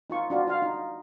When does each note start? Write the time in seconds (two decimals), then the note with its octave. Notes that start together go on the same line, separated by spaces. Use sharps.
0.10 D#4 F4 C#6
0.30 D4 F4 F#4
0.47 F4 F5
0.62 D#4